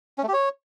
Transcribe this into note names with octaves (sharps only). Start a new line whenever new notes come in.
C#4
A3
G4
C#5